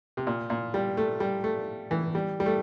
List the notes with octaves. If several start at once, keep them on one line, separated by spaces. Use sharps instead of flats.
C3
A#2
A#2
G3
A3
G3
A3
E3
G3
G3
A3